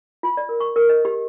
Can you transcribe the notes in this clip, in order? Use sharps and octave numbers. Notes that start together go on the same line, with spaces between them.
F4
D5
A#4
C#6
A#4
D#5
G4